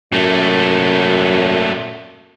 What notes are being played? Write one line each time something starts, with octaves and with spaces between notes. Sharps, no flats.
F#2 A#2 A3